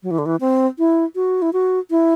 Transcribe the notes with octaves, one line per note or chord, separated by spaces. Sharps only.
F#3
E3
D3
E3
C4
E4
F#4
E4
F#4
E4